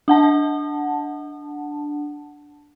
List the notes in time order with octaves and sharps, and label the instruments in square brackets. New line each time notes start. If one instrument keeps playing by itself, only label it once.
[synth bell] D4 F#5 A5